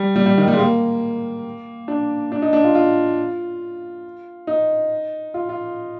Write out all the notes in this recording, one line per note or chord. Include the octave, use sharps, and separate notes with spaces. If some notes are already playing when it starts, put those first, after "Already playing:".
Already playing: G3
G3
G3
D#3
G3
G#3
A#3
D4
D4
D#4
D4
F4
F4
D#4
F4
F4